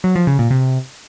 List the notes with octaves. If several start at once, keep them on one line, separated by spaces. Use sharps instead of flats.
F#3
F3
C#3
A#2
C3